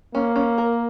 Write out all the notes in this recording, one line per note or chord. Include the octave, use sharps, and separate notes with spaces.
A#3 C#4
C#4
A#4